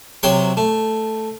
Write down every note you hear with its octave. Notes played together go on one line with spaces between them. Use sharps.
C3 F#3 G5 C6
A3